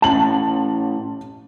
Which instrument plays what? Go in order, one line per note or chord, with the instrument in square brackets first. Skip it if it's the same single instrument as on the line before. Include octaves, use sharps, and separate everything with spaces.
[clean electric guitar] A2 C#4 [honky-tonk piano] A5 F#7